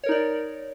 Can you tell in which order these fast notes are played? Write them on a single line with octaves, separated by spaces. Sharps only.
C#5 A#4 D#4 D5